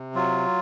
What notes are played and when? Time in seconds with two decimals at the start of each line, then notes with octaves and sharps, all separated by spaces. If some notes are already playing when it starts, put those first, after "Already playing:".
Already playing: C3
0.15 F#3 F4